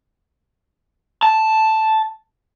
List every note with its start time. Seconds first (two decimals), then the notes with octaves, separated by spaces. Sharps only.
1.23 A5